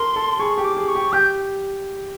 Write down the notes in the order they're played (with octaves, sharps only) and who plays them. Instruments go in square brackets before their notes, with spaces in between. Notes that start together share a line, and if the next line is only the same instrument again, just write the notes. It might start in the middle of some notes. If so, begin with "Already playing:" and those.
Already playing: [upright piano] A4 A#4 [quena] C6
[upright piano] A4
[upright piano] G#4 [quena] C#6
[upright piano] G4
[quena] D6
[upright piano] G#4
[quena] C#6
[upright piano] G4
[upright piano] G4 [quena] G6